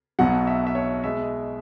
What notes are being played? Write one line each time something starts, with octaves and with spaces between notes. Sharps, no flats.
B1 B2 F#3 F#5
E5
E5
C#5
B2 G#3 E5